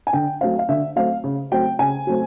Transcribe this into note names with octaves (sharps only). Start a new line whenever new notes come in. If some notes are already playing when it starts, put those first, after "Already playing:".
G#5
D3 G5
F#3 A3 C4 F5
F5
D3 E5
F#3 A3 C4 F5
C#3
F#3 A3 C4 G5
C#3 G#5
F#3 A3 C4